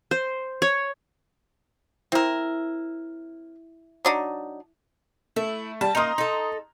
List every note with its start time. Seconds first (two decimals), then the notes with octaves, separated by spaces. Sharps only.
0.11 C5
0.62 C#5
2.12 C4 E4 A#4 E6
4.05 F#3 D4 D#4
5.36 A3 E4
5.81 G3 A5
5.95 A#3 D#4 A#5 C6 D#6
6.18 D#4 A4